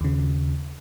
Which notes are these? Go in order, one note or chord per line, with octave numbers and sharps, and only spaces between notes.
D#2 C#3